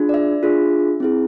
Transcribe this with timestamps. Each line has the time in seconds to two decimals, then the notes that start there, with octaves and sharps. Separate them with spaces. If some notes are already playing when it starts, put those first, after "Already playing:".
Already playing: D4 F4 G#4
0.09 D5
0.14 E5
0.43 D4 F4 G#4
1.00 C4 E4 G#4